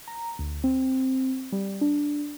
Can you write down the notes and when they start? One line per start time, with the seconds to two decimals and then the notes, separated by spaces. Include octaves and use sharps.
0.07 A#5
0.39 D2
0.64 C4
1.52 G3
1.81 D4